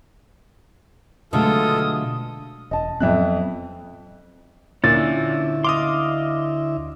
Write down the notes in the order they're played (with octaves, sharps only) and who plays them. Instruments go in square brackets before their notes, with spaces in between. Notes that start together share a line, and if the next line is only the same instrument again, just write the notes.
[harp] B2 F#3 [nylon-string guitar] D3 G#3 A3 [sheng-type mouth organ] F4 A4 [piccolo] D#6
[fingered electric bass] E1 [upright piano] D#5 A5
[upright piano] F2 E5 F#6 [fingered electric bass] F#3 B3 C4
[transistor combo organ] D2 E4 E5 [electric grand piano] A#2 [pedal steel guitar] C#4 D4 [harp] A6
[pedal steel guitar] D#5 F5 C6 [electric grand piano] D6 D#6